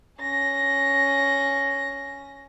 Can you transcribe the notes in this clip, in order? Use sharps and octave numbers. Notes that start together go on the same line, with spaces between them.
C#4 A#6